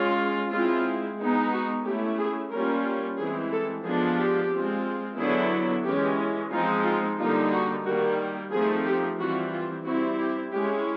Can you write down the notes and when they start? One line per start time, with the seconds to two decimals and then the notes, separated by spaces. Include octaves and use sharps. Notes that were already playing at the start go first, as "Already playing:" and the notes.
Already playing: G#3 C#4 F4
0.50 G#3 C4 E4 F4
1.17 G#3 B3 D#4
1.52 F#4
1.85 A3 C#4 E4 G4
2.18 G#4
2.51 G3 A#3 C#4 F4 A#4
3.18 E3 G#3 C4 G#4
3.52 A4
3.85 F3 G#3 B3 D4 F4 G#4
4.18 G4
4.51 G#3 C4 F4
5.18 D3 F#3 B3 E4 G#4
5.85 E3 G#3 C#4 G4
6.52 F3 G#3 C4 D#4 F4
6.85 F4
7.19 D3 G3 A#3 D#4 F4
7.52 F#4
7.85 D#3 G3 A#3 F#4
8.52 F3 A3 C4 D#4 G#4
8.86 G4
9.19 E3 G3 C4 F4 F#4
9.52 F4
9.86 G3 C4 E4 F#4
10.19 G4
10.53 G#3 C#4 E4 G4